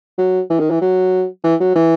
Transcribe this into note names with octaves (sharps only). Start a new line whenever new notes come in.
F#3
E3
D#3
E3
F#3
E3
F#3
E3